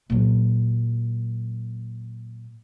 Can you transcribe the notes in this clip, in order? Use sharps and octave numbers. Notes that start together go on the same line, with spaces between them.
A#2 F#3